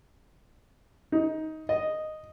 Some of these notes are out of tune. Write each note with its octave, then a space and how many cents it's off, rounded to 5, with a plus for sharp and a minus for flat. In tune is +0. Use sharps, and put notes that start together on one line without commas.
D#4 +15
D#5 -5